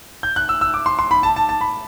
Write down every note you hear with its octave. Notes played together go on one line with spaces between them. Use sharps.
G6
F#6
E6
E6
D6
C6
C6
B5
A5
A5
A5
B5